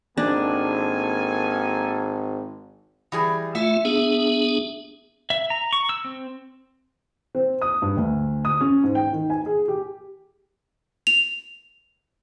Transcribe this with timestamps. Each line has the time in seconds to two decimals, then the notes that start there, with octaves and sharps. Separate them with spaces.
0.17 G#1 A#3 D4 A4 G#5
3.12 E3 G3 G#4
3.55 A3 F4 E5
3.85 B3 D4 G#4 E5
5.30 E5
5.50 A#5
5.73 C#6
5.89 E6
6.05 C4
7.35 C4
7.61 D#6
7.82 G2
7.97 D2
8.45 D#6
8.61 C#4
8.83 G#2
8.95 G5
9.13 D#3
9.30 G#5
9.46 G#4
9.68 G4
11.07 F7